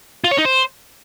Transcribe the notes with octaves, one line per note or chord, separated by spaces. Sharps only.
F4
C#5
D#4
C5